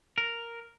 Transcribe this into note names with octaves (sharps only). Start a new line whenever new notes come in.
A#4